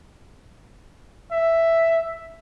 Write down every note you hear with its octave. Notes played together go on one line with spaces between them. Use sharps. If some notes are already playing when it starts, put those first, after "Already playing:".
E5